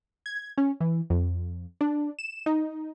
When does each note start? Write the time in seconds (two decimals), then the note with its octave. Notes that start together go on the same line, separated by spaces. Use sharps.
0.26 G#6
0.58 C#4
0.80 E3
1.10 F2
1.81 D4
2.19 E7
2.46 D#4